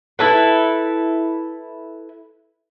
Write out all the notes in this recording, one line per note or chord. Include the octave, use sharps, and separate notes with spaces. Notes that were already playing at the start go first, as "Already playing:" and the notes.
E4 A4 B4